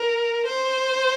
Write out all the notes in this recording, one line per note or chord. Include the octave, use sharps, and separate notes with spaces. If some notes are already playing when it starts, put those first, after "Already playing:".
Already playing: A#4
C5